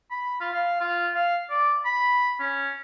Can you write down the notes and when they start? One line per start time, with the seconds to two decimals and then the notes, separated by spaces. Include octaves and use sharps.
0.11 B5
0.41 F4
0.53 F5
0.81 F4
1.15 F5
1.50 D5
1.85 B5
2.40 C#4